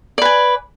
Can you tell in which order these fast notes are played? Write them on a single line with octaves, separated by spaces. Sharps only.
D5 B4 G#5